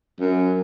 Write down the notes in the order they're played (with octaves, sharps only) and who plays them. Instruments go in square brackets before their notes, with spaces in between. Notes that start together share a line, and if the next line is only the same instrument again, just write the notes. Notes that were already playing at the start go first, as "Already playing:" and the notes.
[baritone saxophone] F#2